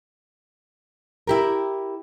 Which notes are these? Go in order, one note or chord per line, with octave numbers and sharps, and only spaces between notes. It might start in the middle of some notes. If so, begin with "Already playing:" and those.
E4 G4 A#4